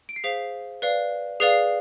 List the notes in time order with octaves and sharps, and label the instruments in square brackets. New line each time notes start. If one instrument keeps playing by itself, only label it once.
[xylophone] D7
C7
G#4 C5 F5 B6
B4 D5 F5
G#4 B4 D5 F5 C7